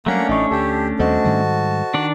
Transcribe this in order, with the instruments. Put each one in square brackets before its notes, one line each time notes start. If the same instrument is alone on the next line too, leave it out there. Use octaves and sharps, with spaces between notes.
[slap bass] F#3 G3 [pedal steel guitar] A3 C#4 D4 [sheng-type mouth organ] A#3 F#5 A#5
[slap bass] A1 [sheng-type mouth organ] D#4 [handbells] E5 C#6
[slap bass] D2 [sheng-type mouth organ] G4 [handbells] A4 A5
[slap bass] D#2 G3 C4 [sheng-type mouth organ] F#4 A5 [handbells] A4 C5 D#5
[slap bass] G#2 D#3 G3
[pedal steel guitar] D#3 D4 D5